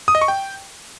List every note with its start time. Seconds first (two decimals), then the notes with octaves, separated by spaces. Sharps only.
0.08 D#6
0.15 D#5
0.21 C#6
0.28 G5